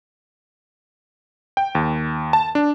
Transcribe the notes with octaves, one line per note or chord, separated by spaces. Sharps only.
G5
D#2
A5
D4